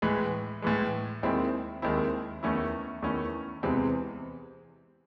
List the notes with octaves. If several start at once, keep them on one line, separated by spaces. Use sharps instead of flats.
A2 E3 G#3
A2 E3 G#3
D#2 D#3 G#3 C4 E4
D#2 D#3 G#3 C4 E4
E2 D#3 A3 C#4 E4
E2 D#3 A3 C#4 E4
E2 C3 E3 G#3 C4